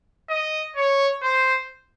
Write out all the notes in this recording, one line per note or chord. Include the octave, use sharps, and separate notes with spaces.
D#5
C#5
C5